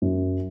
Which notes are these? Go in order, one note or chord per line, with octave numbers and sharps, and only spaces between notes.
F#2